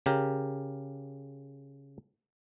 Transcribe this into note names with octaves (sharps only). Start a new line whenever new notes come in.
C#3 G4 A#4